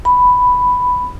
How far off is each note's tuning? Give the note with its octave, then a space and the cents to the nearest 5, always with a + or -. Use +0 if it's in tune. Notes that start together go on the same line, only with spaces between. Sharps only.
B5 +5